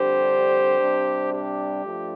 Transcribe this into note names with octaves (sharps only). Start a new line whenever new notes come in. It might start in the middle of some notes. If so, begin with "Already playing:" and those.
Already playing: F2 D3 G3 D4 G4 C5
C3 G3 D4
G4
G2 F3 A3 D4